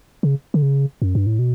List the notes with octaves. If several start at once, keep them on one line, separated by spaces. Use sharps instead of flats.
C#3
D3
C#3
F#2
G2
A2
B2